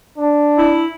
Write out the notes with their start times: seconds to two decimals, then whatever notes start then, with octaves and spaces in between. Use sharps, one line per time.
0.17 D4
0.58 E4